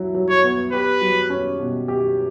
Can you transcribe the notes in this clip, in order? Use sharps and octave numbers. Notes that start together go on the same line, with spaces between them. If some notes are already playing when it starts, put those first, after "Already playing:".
Already playing: F#3 E4
F#3
C#5
B3
G4 B4
F#3
C#4
B2
G4